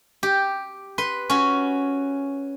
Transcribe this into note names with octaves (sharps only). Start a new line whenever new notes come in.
G4
B4 C6
C#4 F#4